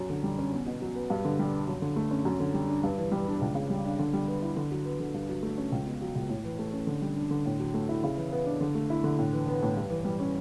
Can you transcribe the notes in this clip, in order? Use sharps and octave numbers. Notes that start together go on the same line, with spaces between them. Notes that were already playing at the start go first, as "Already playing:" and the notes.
Already playing: F#2
D3
G3
C#4
E2
B2
F#3
B3
G2
D3
G3
D4
F#2
D3
A3
C#4
F#2
D3
G3
D4
G2
E3
G3
D4
C#2
C#3
G3
D4
D3
G3
B3
E4
D3
F#3
B3
D3
G2
F#3
A3
C#4
C#2
B2
F#3
C#2
A2
E3
A3
C#4
D3
G3
D4
D3
A2
F#3
A3
E4
C#3
E3
B3
D4
D3
A3
E4
D3
A2
E3
B3
A2
G2
E3
G3
C#4